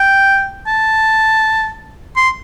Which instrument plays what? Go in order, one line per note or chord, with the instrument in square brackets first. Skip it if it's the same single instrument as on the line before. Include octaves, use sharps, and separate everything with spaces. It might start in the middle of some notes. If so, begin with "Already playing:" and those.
Already playing: [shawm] G5
A5
C6